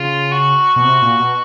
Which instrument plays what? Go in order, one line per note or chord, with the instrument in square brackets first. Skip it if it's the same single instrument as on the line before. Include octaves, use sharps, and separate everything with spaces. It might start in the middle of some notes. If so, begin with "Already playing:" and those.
Already playing: [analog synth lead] C#3 [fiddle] F4
[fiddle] F#4
[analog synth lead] B2
C3
A#2
B2